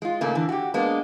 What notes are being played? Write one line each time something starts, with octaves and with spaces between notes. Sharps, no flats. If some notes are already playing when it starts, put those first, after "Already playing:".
G#3 F4
G#2 C#3 A3 A#3
D3 E3
F#4 G4
G#3 A#3 B3 D4